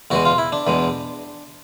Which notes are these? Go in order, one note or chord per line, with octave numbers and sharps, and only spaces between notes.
E2 B2 G#3 F#4
F4
E4
D4
E2 B2 G#3